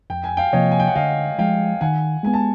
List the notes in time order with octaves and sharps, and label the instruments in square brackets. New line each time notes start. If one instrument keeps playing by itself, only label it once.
[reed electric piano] F2 [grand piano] G5
[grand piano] G#5
F5 G5
[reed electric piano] C3 F3 A#3 [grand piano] C#5 D#5
[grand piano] G#5
G5
F#5
[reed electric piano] D3 [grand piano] D#5 F5
[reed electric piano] F3 G#3 [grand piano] F5 G5
[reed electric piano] D#3 [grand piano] F#5 G#5
[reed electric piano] G#3 B3 [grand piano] G#5
[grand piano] A5